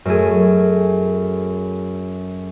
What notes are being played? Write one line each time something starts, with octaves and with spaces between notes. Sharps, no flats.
F#2 A3 G#4